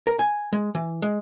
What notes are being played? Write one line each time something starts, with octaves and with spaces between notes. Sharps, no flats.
A#4
G#5
G#3
E3
G#3